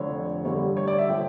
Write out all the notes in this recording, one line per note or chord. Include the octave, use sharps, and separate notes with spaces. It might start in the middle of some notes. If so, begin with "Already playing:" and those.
Already playing: F1 F2 D3 C#5
A1 G2 D3 G3 C#5
C#5
D5
E5
F3 A3 G5